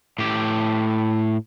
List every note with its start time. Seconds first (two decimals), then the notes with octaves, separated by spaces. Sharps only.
0.19 A2 G4